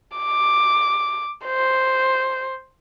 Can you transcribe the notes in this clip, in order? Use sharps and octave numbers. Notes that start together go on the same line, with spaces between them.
D6
C5